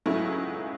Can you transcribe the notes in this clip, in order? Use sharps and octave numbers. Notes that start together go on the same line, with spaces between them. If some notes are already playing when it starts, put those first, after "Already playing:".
C#2 C#3 F#3 A3 E4